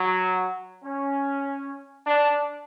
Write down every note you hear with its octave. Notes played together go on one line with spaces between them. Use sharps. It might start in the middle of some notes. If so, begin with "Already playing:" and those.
Already playing: F#3
C#4
D4